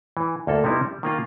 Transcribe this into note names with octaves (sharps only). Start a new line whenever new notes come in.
E3
D2 A#3 A4
C3 G3 B3 D#4 E4
G3
D#3 A#3 F4